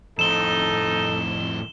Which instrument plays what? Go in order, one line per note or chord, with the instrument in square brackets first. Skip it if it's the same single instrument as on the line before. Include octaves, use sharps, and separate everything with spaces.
[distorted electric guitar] F2 A2 [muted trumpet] D#4 [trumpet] A4 [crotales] E7 G7